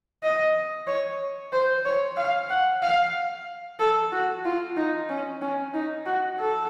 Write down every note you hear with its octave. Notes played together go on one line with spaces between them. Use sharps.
D#5
C#5
C5
C#5
F5
F#5
F5
A4
F#4
F4
D#4
C#4
C#4
D#4
F#4
A4